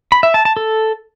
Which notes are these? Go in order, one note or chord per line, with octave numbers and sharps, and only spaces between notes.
B5
E5
A5
A5
A4